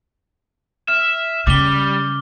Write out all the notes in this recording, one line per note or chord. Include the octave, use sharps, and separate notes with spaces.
E5 F6
C#3 G3 D6 G7